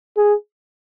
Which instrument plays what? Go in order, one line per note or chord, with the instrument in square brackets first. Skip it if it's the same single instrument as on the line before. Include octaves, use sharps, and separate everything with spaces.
[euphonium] G#4